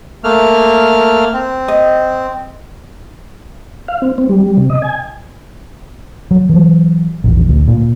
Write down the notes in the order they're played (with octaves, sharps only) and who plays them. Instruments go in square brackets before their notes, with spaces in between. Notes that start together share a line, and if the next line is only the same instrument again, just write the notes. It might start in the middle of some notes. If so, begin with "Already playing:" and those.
[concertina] A3 A#3 F6
C4
[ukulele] D#5
[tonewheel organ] F5
C4
C4
G3
G3
C3
D#5
G#5
[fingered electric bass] F#3
E3 F#3
A#1 E2
D2
A#2